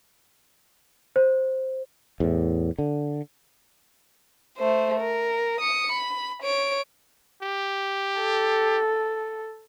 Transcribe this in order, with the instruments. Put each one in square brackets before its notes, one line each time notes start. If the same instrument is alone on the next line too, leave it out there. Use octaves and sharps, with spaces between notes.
[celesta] C5
[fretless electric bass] E2 A2
D3
[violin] A3 C5
A#4
D#6 C#7
B5
C#5 D7
[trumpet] G4
[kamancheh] A4